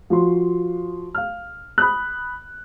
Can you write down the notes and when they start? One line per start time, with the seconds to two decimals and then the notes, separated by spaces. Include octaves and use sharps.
0.10 F3 F#4 C6
1.15 F5 F6
1.78 B5 D#6 F#6